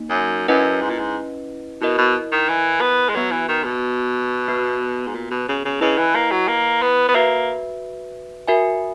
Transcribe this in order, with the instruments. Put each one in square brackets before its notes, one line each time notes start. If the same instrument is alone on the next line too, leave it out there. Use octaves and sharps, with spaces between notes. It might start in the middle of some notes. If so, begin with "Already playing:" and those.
Already playing: [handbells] A#3 D#4
[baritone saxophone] F#2
[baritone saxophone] F#2 [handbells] C#4 E4 B4 D#5 F#5
[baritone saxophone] G#2
A#2
G#2
[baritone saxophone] B2 [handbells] E4 A#4 D#5
[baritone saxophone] B2
D#3
E3
B3
G#3
[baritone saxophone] F#3 [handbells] B3 F#4 B4
[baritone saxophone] E3
D#3
B2
[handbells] B3 F#4 B4
[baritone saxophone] G#2
A#2
B2
C#3
C#3
[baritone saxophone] C#3 [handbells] E4 B4 D#5
[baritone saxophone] E3
A#3
F#3
A#3
B3
B3
[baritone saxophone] A#3 [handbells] F#4 B4 E5
[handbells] F#4 A#4 E5 G#5